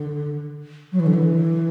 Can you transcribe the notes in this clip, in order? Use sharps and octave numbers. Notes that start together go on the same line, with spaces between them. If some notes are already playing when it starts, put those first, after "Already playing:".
Already playing: D3
F#3
E3
D3
E3